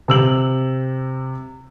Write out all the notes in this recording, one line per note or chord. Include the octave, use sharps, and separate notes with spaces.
C3 E6 F#7